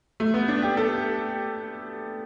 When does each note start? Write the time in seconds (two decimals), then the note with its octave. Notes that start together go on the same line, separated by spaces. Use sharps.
0.20 A3
0.34 B3
0.48 D4
0.62 G4
0.77 A4